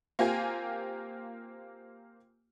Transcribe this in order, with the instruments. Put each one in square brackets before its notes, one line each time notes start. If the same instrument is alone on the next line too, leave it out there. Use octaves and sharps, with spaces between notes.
[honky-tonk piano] A#3 C4 F4 G4 G5 G#5